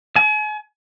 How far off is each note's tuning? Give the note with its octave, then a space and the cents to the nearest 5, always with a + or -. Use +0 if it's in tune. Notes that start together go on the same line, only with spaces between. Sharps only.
G#5 +40